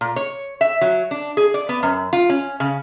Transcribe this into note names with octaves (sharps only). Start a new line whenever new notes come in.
A#2
C#5
E5
F#3
D4
G#4
D5
B3
F#2
F4
C#4
C#3